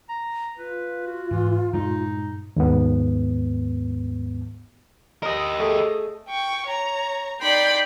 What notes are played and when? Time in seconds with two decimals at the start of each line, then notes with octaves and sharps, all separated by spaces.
0.09 A#5
0.58 F4 B4
1.07 F#4
1.31 G#2 E3
1.73 G2 A#2 G#3 D#4
2.56 D#2 G#2 B3
5.22 G4 A#4 D#5 D#6
5.60 A3 G#4
6.29 G5 C#6
6.68 C#5 A#5
7.41 D#4 D5 G5 B5 C6